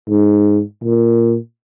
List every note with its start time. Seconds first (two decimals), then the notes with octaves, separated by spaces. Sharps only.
0.09 G#2
0.84 A#2